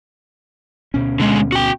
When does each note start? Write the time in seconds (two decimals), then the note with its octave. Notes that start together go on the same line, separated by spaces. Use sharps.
0.94 D2 B2 C#4
1.20 D3 G#3
1.52 F#4 G5